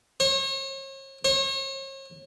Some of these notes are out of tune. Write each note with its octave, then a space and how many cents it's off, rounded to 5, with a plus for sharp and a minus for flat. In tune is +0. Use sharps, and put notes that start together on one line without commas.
C#5 -40
C#5 -40